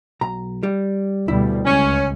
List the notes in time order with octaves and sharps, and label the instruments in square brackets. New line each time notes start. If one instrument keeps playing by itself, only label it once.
[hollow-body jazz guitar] B1 A#5
G3
[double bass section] D2 B2 G3 [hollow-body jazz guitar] E4
[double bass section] C#2 [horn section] C#4